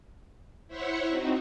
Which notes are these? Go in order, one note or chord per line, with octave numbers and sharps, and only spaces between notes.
E4 C5 C#5 E5 F#5 C#6
C4 D#4 F#4